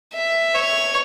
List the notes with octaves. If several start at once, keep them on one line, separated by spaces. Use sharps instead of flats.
E5
C#5